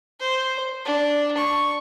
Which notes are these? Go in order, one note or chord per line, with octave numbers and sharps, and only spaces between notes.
C5
D4
C#6